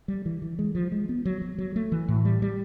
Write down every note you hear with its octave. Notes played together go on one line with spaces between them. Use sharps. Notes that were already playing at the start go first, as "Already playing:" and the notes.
G3
E3
E3
G#3
F3
G#3
B3
F#3
F#3
F#3
A3
E3
A2
G3
G3